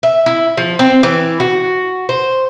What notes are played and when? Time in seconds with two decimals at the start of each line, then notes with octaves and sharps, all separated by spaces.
0.03 E5
0.26 E4
0.57 F3
0.79 C4
1.03 E3
1.40 F#4
2.09 C5